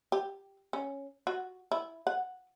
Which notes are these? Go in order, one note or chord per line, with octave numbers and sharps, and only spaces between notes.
G4
C#4
F#4
E4
F#5